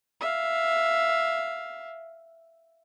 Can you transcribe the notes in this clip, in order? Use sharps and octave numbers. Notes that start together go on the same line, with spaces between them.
E5 F5